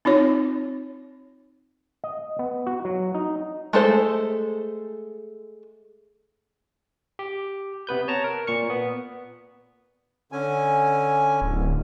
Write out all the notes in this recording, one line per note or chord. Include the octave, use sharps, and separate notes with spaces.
C4 D#4 F4 C#5
D#5
B3
F#4
F#3
D#4
G#3 A3 A4 C5
G4
C3 B3 B4 G6
C#5 A5 A#5
A#4
A#2 C#6 C#7
B3
D3 C#4 G#5
D1